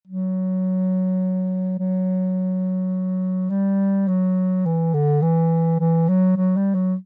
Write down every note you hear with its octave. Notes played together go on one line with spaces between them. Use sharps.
F#3
F#3
G3
F#3
E3
D3
E3
E3
F#3
F#3
G3
F#3